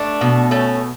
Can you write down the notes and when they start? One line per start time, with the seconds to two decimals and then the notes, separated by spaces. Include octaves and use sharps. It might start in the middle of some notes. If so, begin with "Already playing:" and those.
Already playing: A3 D4
0.21 B2
0.51 A3 C#4